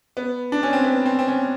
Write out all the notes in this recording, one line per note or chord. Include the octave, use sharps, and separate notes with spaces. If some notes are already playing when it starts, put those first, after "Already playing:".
B3
D4
C#4
C4
B3
C4
C4
C#4